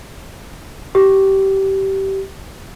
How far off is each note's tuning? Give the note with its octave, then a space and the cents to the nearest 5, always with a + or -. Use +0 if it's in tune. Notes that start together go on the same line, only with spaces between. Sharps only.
G4 -20